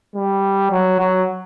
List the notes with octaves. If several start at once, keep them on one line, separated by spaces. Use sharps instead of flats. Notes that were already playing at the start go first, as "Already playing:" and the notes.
G3
F#3
F#3